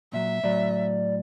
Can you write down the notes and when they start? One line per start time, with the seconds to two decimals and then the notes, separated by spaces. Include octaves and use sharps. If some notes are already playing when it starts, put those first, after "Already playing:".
0.13 A#2 F#3 E5
0.43 A2 F#3 D5